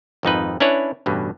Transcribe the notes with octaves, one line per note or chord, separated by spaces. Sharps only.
G#1 F2 D#4 B4
C#4 D4 E4 B4 C#5
A1 G2 B2